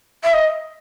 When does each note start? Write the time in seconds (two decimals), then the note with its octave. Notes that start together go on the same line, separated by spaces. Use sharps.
0.24 E5
0.34 D#5